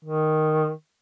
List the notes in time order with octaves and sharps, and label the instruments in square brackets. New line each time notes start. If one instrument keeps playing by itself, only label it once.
[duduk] D#3